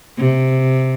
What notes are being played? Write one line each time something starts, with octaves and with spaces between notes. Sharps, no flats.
C3